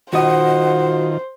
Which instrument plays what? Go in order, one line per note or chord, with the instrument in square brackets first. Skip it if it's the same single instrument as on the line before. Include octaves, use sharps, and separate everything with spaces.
[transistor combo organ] D#3 F4 [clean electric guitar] F#4 D#5 [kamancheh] C5 [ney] F#5